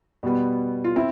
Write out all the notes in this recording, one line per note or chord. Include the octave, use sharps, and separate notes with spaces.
B2 G3 B3
F4
C4 E4